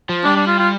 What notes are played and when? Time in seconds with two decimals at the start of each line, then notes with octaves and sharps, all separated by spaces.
0.09 F3
0.24 G3 D4
0.36 D4
0.47 F4
0.59 F4